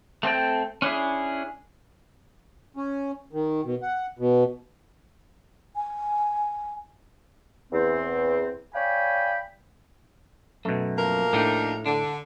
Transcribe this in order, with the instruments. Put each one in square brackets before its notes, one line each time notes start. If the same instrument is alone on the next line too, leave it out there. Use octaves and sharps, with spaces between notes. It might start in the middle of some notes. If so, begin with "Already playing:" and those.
[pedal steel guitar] A3 C4 A4 G5
C#4 D4 E4 G#4
[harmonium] C#4
D#3
B2
F#5
B2
[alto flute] G#5
[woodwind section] E2 C4
C#5 D5 F5 G5 G#5 B5
[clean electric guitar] F#2 [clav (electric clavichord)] B2 A3
[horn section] F3 A#3 A#4
[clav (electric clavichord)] A2 [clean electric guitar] D4 D#4 G4
[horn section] D3 [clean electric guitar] D4